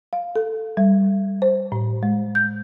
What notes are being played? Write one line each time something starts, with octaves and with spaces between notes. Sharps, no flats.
F5
A4
G3
C5
A2
G#3
G6